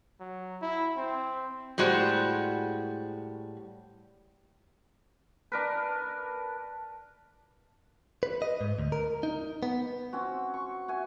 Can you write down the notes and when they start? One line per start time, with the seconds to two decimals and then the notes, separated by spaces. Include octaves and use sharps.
0.21 F#3
0.62 E4
0.98 C4
1.78 A2 G3 G#3 F#4 C5
5.52 D4 A#4 B4
8.23 B4
8.42 D#5
8.61 G#2
8.79 D2
8.92 A#4
9.23 D#4
9.63 B3
10.13 C4 C#4 F#4
10.54 C#6
10.88 F#4 E5 G#5